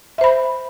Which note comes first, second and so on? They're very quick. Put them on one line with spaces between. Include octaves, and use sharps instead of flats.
E5 C5 B5